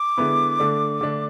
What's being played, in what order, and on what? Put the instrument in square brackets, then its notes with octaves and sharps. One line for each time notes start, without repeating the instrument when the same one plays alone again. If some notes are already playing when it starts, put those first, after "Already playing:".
Already playing: [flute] D6
[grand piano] D3 G#3 B3 E4
D3 A3 D4
D3 A3 D4